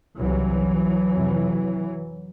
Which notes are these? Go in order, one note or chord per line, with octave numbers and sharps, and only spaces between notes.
C2 C3 E3 F#3
F2 C3